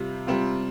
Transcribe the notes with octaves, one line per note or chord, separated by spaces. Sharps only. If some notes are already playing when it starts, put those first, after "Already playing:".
Already playing: C3 G3 C4 F4
C3 G3 C4 F4